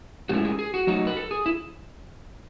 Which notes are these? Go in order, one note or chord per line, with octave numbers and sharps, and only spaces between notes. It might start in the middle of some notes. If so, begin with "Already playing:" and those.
A2 G#3 C#4 E4 F#4
G#4
G#4
F#4
F#3 A3 D#4 F#4
B4
A4
G#4
E4